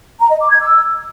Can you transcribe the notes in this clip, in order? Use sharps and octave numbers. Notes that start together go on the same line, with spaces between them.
A#5
D#5
D6
G#6
E6